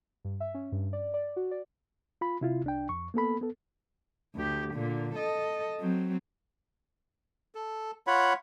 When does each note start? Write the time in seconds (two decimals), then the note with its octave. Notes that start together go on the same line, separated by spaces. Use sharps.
0.25 G2
0.40 E5
0.54 C#4
0.72 G2
0.93 D5
1.14 D5
1.36 F#4
1.51 D5
2.21 F4 B5
2.41 C3 E4 F4
2.64 C2 D4 G5
2.89 F2 C#6
3.14 A#3 B3 A4 B5
3.41 B3 A4
4.35 D2 G4
4.73 A#2 D3
5.15 A4 D#5
5.80 F#3 C4
7.55 A4
8.07 F4 C#5 F#5 B5